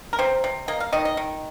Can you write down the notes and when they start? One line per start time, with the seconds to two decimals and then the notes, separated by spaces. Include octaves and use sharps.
0.13 A#4
0.19 C3 C5
0.44 C3
0.68 A#3 D#5
0.80 F5
0.93 D#3 D#5
1.05 D#5
1.17 D#3